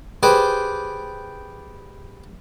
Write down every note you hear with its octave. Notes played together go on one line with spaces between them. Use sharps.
G4 G#4 B4 C5 D5